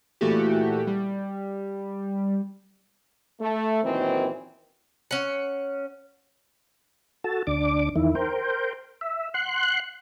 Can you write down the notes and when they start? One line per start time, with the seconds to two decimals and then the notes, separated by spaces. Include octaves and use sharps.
0.21 A#2 E3 A3 F#4 G4
0.87 G3
3.41 A3
3.84 F#2 A#2 D#3 E3 C4
5.11 C#4 F#5
7.24 F#4 A4 A5
7.47 D2 D4 D6
7.96 E2 D#3 E4
8.15 A#4 C5 G5
9.01 E5
9.34 F#5 C6 F#6